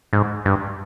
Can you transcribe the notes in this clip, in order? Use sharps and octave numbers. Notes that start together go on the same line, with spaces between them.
G#2
G2